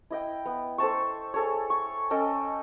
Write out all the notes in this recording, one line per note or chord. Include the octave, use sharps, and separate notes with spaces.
E4 D#5 G5
B3
A4 C5 A5 C#6
G#4 A4 C#5
C#6
C#4 A4 D#5 G5